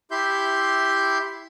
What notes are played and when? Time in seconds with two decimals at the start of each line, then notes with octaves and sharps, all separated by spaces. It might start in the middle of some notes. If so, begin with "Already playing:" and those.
0.11 E4 G4 E5 C6 G6